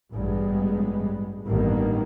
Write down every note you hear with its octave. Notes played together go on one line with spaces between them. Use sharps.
A1 G2 G3 G#3 B3
A1 G2 D#3 A#3 B3